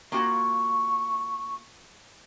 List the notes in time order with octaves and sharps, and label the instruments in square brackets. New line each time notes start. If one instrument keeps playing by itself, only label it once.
[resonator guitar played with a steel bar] A#3 F4 F#4 [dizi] C#6